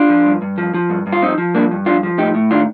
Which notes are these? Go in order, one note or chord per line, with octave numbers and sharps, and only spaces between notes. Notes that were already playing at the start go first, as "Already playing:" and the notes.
Already playing: D4 F4
F3
G2
G2
F3
F3
G2
G2
F4
F3 C4 D#4
F3
G2 A#3 D4
G2
F3 D4 F4
F3
A2 D#4 G4
A2
D#3 D4 F4